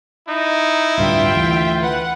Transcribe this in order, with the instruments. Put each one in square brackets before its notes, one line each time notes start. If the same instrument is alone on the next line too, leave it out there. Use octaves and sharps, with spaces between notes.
[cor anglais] D#4 [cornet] E4
[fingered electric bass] D1 G2 D3 [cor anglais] F4 [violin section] E5 G5
[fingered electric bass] D2 E3
[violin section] B4 F#5